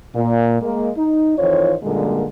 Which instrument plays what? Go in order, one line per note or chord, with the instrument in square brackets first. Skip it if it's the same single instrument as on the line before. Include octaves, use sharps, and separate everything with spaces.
[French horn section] A#2
G#3 A#3
D#4
F2 D#3 E3 F4 C5 C#5
F#2 A#2 D3 G3 G#3 A#3